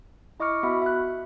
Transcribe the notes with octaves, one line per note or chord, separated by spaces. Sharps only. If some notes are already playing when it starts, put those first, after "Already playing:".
E4 D#5 C#6 D6 F6 C#7
B3 F#4 E5 B5
E5 F#6